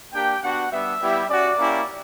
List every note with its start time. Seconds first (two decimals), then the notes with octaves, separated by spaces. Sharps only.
0.13 A#3 D4 G4 G5
0.42 B3 D4 F#4 F#5
0.71 G3 B3 D4 E5
1.01 G3 B3 E4 G4
1.29 C#4 F#4 D5
1.59 A#3 C#4 E4 G4